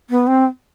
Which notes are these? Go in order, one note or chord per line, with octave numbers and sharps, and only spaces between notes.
B3
C4